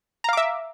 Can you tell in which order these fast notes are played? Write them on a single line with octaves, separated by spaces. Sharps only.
A#5 F5 D6 E5